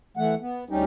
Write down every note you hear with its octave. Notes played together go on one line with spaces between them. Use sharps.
E3 A3 F#5
B3
D2 G3 C#4 D#4 G4